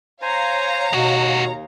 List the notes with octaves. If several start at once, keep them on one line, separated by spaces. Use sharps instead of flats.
C5 C#5 F5 G#5 A#5
D#2 B2 G#3 F#4